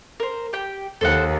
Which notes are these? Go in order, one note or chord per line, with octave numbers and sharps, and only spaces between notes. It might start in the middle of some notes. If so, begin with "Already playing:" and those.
A#4 C5
G4 G5
D#2 A4 C5 F#5